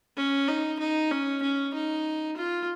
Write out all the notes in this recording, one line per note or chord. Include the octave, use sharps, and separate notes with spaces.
C#4
D#4
D#4
C#4
C#4
D#4
F4